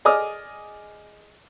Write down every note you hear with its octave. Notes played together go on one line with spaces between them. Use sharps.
G#4 D5 D#5 D6 D#6 F6